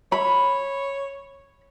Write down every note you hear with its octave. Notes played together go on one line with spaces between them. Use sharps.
C#5 B5